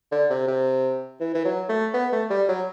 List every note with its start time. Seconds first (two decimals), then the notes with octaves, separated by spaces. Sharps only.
0.12 D3
0.30 C3
0.48 C3
1.20 E3
1.34 E3
1.45 F#3
1.69 A3
1.94 B3
2.12 A3
2.30 G3
2.49 F#3